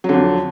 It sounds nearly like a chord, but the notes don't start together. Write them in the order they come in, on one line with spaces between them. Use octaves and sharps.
F#3 D3 F2